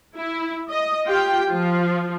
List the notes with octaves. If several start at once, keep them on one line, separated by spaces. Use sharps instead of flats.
E4
D#5
F4 G4 G5
F3 F4